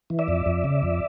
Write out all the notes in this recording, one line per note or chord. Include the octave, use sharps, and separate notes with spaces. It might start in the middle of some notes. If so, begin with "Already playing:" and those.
E3
D5 E5
F2
F2
C#3
F2